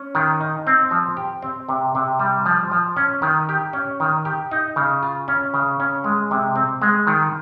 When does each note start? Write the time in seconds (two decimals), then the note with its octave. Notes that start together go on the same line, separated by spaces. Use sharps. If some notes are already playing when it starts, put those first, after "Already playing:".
Already playing: C#4
0.15 D#3
0.41 D#4
0.67 C4
0.91 F3
1.17 G4
1.42 C4
1.69 C3
1.95 C3
2.19 G3
2.46 F3
2.72 F3
2.97 C#4
3.22 D#3
3.49 G4
3.73 C#4
4.00 D#3
4.25 G4
4.52 D#4
4.76 C#3
5.03 F4
5.28 C#4
5.54 C#3
5.80 C#4
6.04 G#3
6.31 C3
6.56 C4
6.82 G#3
7.07 D#3